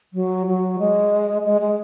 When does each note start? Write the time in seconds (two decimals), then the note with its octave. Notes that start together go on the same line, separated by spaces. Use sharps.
0.13 F#3
0.47 F#3
0.79 G#3
1.45 G#3
1.61 G#3